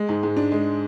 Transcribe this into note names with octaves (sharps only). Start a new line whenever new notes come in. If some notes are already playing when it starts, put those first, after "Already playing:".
Already playing: G#3
G#2
G#2
D4
G#3